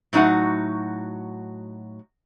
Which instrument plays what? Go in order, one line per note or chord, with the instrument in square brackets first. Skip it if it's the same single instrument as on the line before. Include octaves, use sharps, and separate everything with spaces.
[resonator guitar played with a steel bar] A2 F#3 D#4 F#4 F#5